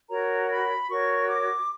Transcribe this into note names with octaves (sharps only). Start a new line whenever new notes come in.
F#4 A#4 C#5 A#5
B5
F#4 A#4 C#5 C#6
D6